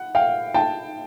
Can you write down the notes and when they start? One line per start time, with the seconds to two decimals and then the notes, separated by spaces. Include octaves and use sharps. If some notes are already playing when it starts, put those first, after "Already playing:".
Already playing: F#5
0.15 F5 G5
0.54 G5 A5